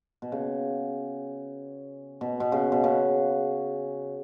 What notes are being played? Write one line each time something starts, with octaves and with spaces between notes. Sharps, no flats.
B2
C#3
B2
B2
C#3
B2
C#3